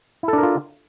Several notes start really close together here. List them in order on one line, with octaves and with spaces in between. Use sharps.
E4 A4 D4 A#4 F4